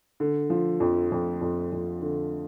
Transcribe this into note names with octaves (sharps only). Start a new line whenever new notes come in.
D3
F3
F2
F2
F2
F2
D3